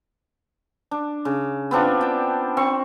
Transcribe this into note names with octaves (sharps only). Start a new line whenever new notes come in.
D4
C#3
B3 C4 D4 F4
G5 A5
C4 C#6